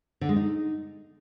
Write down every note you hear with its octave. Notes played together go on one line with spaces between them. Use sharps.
D3
G#3
D#4